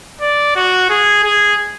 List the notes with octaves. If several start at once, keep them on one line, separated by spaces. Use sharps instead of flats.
D5
F#4
G#4
G#4